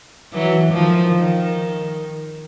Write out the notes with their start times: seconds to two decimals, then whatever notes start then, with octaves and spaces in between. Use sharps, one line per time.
0.33 E3 F#3
0.73 D#3 F3
1.13 D#3